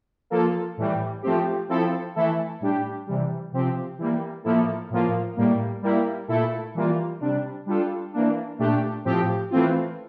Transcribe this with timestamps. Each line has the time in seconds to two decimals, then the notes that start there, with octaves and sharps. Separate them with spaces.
0.30 F3 A#3 F4 A4
0.77 A2 E3 G3
1.22 F3 A3 C4 G4
1.69 F3 C4 E4 A4
2.15 E3 A3 E4 A4
2.60 A2 G3 D4 G4
3.07 C3 E3 G3
3.52 C3 F3 C4 G4
3.98 E3 G3 A#3
4.44 A2 F3 A#3 E4 A4
4.90 A2 F3 A#3 F4
5.37 A2 G3 A#3
5.82 G3 A#3 E4
6.28 A#2 A3 E4 A4
6.75 E3 G3 A#3 F4
7.21 C3 G3 D4
7.66 G3 D4 F4 A4
8.13 E3 A#3 D4
8.59 A#2 A3 D4 G4
9.05 A2 F3 C4 G4
9.50 E3 A3 C4 F4